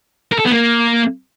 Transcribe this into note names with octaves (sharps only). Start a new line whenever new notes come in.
A#4
A4
B3
A#3